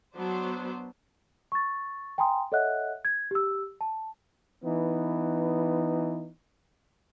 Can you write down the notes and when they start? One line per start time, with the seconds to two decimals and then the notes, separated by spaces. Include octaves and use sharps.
0.16 F#3 B3 D4 C5
1.52 C#6 A6
2.18 G5 G#5 A#5 C6 D#6
2.52 A4 C#5 D#5 E5 F#5 F#6
3.05 G#6
3.31 G4 E6
3.81 A5
4.64 E3 B3 D#4